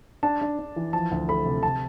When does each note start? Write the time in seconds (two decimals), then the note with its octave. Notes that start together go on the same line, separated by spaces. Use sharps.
0.23 D4 A5
0.41 D4
0.59 D4
0.76 E3
0.93 F3 A5
1.11 D2
1.29 A3 B5
1.45 C3
1.63 C3 A5